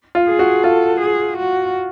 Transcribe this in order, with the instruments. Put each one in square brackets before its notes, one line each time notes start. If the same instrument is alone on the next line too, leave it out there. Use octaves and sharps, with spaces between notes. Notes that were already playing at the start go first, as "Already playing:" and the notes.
[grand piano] F4
[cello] G#4
[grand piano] F#4
[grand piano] F4 [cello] A4
[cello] G#4
F#4